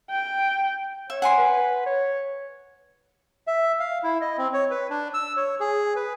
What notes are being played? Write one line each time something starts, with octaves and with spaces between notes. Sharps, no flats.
G5
C#5 E5
F#5 G#5 C6
B4
C#5
E5
F5
E4
D#5
C4
C#5
B4
D4
E6
C#5
G#4
B4